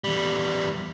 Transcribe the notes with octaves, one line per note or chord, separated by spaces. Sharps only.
E2 G3